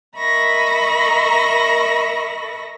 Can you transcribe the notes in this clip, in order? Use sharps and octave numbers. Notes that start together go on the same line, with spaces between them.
A#4 D#5 E5 B5 C#6 A#6